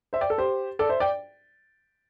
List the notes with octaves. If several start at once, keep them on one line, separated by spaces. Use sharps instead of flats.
C5 E5
D5 G5
A4
G4 C5
A4 D5
C5 E5
D5 G5